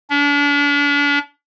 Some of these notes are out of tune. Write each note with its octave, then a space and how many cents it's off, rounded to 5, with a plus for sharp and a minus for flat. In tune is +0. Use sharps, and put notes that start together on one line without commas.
D4 -40